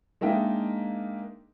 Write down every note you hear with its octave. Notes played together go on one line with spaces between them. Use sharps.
G#3 A#3 D4 D#4 E5 G5